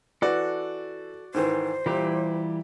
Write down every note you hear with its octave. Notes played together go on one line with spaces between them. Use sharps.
E3 F#4 A4 D5 F#6
G#2 D#3 E3 C5
A#2 E3 G3 E4 G4